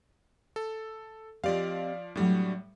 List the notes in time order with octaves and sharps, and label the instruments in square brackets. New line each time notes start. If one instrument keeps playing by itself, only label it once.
[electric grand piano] A4
[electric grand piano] F3 D5 F5 [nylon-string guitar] C4 G4 D#5
[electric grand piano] A2 G3 [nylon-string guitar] F#3 A3 D4